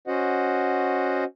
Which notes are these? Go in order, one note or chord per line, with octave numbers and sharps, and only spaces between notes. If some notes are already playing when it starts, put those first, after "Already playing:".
C#4 F#4 C5 D#5 F#5